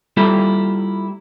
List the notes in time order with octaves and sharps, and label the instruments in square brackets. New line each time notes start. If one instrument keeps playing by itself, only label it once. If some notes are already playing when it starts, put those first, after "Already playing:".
[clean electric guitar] G3 A#3 E4 F4 G4 A4